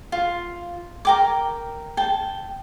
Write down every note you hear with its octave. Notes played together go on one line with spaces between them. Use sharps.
F4
A#4 G5 D6
G5 A5